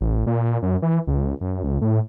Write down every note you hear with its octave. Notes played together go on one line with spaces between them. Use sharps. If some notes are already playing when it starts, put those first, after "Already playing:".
A1
A#2
F#2
E3
C#2
F#2
C#2
A2